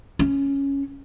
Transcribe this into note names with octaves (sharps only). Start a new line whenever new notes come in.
C#4